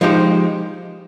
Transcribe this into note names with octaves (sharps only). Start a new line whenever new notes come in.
F3 G#3 D#4 G4 C5